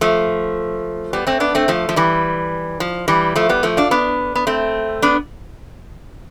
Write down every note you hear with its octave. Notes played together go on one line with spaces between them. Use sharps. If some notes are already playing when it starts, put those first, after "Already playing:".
F3 A3
G3 B3
A3 C4
B3 D4
A3 C4
F3 A3
F3
E3 G3
F3
E3 G3
F3 A3
G3 B3
F3 A3
D4 F4
B3 D4
B3
A3 C4
B3 D4